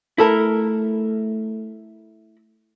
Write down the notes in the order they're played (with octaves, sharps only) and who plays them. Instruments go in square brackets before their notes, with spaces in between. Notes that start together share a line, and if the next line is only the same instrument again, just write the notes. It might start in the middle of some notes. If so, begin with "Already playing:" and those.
[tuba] A3 [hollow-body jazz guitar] E4 A4 A#4